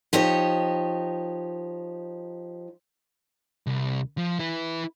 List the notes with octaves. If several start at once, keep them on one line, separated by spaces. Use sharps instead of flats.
F3 D#4 G4 C#5
C2
F3
E4 B4